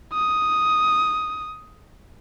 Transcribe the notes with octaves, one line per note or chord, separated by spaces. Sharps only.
D#6